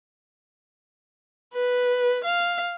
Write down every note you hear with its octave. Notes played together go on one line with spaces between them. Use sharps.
B4
F5